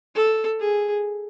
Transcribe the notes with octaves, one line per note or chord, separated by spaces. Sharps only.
A4
G#4